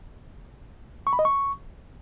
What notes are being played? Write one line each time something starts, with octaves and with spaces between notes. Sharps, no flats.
C#6
B5
D#5
C#6